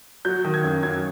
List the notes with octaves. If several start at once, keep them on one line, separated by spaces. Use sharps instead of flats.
F#3 G6
D#3
G#6
F#2
F#2 G#6